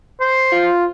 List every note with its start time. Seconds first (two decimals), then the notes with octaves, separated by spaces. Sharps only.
0.20 C5
0.52 F4